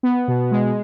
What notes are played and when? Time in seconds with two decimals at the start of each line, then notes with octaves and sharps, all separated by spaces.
0.03 B3
0.28 B2
0.51 G#3